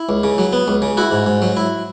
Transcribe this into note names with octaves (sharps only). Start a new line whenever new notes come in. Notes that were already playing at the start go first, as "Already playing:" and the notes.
Already playing: E4
C#2
C#3
F#3
B3
C#2
C#3
E4 F#4
G#2
G#2
F#3
E4